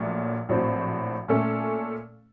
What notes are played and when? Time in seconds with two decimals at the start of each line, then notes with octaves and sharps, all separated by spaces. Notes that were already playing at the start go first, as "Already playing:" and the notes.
Already playing: A#1 A#2 F#3 A3
0.49 A#1 A2 F#3 C4 F#4
1.28 A#2 A3 C#4 A4